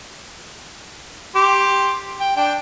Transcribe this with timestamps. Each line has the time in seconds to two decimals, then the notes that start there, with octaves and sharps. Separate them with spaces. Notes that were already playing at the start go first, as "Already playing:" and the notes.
1.35 G4 C6 D6
2.20 G5
2.37 D4 G5